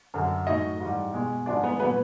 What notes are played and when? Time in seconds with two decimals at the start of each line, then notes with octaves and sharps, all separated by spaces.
0.14 F#2 D3 F#3
0.47 A2 F#3 D#4 D#5
0.80 G#2 E3 G3
1.13 B2 G#3
1.46 G#2 F3 G#3 D4 D5
1.63 B3 B4
1.80 A#2 F#3 B3 B4